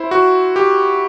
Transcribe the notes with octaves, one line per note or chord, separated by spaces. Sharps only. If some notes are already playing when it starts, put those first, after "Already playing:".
Already playing: E4 C5
F#4
G4